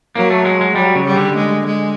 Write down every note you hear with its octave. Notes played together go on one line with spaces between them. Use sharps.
F#3 A#3
A3
G#3
G#3
F#3 G3
C#3
G3
D3
G#3
G#3